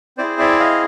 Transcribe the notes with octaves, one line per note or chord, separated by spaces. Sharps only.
C4 E4 G#4 C5 D5
D5 E5
D#5 F5